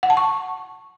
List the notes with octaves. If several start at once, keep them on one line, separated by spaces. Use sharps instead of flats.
F#5
A5
C#6